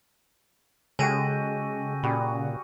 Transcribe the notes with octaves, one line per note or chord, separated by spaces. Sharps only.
C#3 G#3 F#4 G4 A4 G#5 A#6 D#7
A#2 G3 F#4 G#4